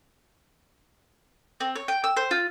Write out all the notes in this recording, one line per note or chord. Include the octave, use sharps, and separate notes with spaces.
C4
C#5
G5
E6
C5
F4